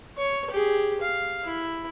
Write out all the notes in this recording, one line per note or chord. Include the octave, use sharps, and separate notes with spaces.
C#5
G4 G#4
F5
E4